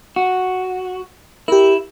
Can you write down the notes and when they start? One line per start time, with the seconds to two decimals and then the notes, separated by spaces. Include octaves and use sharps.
0.16 F#4
1.48 E4 G4 A#4